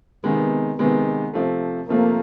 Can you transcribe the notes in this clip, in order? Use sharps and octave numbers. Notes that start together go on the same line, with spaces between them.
C3 D#3 G#3 B3
C3 D#3 G#3 B3
C3 F3 A3
C3 F3 A3 A#3